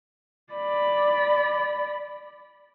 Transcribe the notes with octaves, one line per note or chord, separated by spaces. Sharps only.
D5 B5